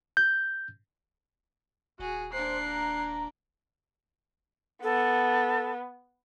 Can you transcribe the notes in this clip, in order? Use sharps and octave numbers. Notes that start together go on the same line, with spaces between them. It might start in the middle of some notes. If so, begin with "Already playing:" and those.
G6
D#1 F#4 G#4
A#3 D4 C5 F#6 C7
A#5
B3 A4